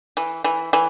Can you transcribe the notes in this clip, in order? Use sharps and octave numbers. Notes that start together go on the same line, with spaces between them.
E3
E3
E3